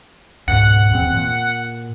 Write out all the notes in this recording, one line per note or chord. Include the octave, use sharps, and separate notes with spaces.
C#2 G#2 B2 F#5
D#1 E2 C4
A#2